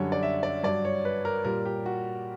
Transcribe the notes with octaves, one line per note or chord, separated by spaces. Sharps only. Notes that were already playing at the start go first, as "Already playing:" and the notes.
Already playing: F#2 D3 G3 C#5
D5
E5
D5
G2 F#3 D5
C#5
B4
A#4
A#2 G3 A#4
G4
F#4